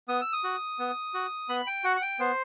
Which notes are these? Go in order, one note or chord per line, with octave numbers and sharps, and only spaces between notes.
B3 D#6
E6
D#6
F#4
B3
F#4
B3 B5
G5
F#4 F#5
F#5
G5
B3 C5